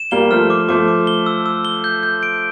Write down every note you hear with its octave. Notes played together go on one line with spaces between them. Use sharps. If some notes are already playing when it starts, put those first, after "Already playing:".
Already playing: E7
G3 A#3 G7
F3 A3 F6
D6
F3 A3 D6
D6
G7
E6
E6
G7
G6
G6
D7